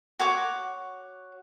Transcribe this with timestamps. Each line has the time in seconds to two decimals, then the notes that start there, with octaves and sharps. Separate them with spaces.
0.19 F#4 C#5 D6